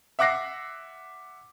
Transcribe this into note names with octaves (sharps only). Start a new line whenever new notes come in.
E5 F#5 D6 F#6 A#6 C7